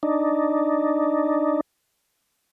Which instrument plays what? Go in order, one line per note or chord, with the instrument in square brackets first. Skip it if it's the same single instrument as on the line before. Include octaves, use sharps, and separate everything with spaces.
[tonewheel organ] D4 D#4